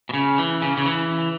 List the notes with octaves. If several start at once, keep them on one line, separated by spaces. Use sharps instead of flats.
B2
C#3
E3
C#3
C#3
E3